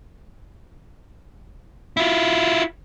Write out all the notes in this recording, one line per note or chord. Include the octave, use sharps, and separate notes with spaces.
E4 F4